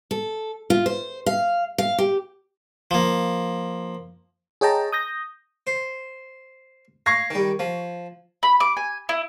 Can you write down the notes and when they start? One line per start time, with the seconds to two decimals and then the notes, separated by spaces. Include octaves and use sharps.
0.11 A4
0.70 F4
0.86 C5
1.26 F5
1.78 F5
1.98 G4
2.91 F3 A#3
4.61 G#4 C#5 D#5 G5 A5 A#5
4.92 D#6 G6 A#6
5.67 C5
7.06 F5 C#6 G#6 A#6
7.30 D#3 G3
7.59 F3
8.43 B5
8.60 D6
8.77 G#5
9.09 E4